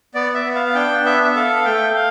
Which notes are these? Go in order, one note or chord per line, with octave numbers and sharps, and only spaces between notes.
B3 D5
E5
B3
F5
F5
D4 G5
B3 E5
E5
A4 F5
F5
A3 G5
F5